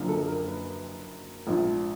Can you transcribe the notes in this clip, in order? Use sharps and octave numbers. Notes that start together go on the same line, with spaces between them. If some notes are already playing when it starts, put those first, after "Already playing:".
Already playing: F#1 F#2 D3 F3 A#3
A4
A#4
B4
A#1 G#2 F3